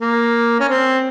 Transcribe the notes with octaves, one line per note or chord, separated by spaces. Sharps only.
A#3
C#4
C4